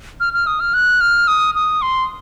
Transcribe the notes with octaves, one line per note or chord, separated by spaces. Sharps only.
F6
F6
D#6
F6
F#6
F6
D#6
D#6
C6